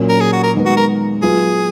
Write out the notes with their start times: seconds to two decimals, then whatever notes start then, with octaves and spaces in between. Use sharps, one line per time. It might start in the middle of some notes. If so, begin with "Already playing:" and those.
Already playing: A#2 F#3 C#4
0.09 A#4
0.20 G#4
0.33 F#4
0.43 A#4
0.55 D#3 G#3 B3
0.66 F#4
0.77 A#4
1.22 F#3 B3 F4 G#4